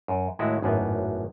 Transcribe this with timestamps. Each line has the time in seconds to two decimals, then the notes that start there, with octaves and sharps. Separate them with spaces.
0.08 F#2
0.39 D#2 A2 G#3 E4 F#4
0.62 G#1 F#2 A2 A#3 B3